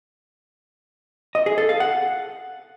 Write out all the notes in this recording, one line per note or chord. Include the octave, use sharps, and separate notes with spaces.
D#5
G#4
A4
F5
F#5